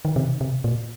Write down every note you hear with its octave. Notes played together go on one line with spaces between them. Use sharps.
D#3
C3
C3
A#2